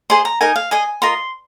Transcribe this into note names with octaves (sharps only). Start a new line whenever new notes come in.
G#4 C5 D#5 C6
A#5
D#4 A#4 D#5 G#5
F5
G#4 D#5 G#5
F4 A#4 D#5 C6